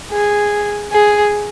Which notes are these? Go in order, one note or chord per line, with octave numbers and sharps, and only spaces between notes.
G#4
G#4